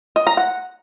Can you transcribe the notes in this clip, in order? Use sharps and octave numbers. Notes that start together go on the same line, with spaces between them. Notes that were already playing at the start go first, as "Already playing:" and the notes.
D#5
A#5
F#5